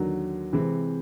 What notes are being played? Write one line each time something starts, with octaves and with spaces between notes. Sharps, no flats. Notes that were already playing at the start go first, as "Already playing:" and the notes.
Already playing: D#2 D3 F#3
C3 E3 G#3 C4